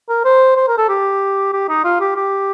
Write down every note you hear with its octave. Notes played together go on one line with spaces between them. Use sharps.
A#4
C5
C5
A#4
A4
G4
G4
D#4
F4
G4
G4